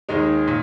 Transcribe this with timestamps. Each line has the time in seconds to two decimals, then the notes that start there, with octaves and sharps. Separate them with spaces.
0.09 D#2 D#3 G#3 D#4
0.47 A#2